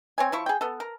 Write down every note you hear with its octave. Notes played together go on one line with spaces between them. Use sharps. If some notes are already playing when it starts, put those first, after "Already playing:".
C4 C#5 G#5
F3 E4 C#6
G#4 G5
B3 A4
A#4